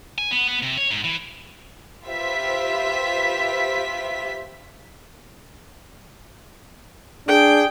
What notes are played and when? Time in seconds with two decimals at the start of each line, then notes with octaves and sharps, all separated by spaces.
0.18 G#5
0.31 B3
0.48 B3
0.63 C3
0.78 C#5
0.91 G#2
1.04 E3
2.04 F4 G4 B4 C5 E5 B6
7.28 D4 G#4 G5